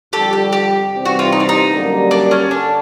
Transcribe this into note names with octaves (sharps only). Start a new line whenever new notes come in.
F2 D3 G3 G4 A4
G4
G4
C3 E3 G3 C4
F#4
F4
D#4
D4
D#4
F#2 D3 G3 A#3
D4
C#4
D3 D4